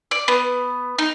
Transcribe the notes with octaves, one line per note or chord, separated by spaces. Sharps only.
D5
B3
D#4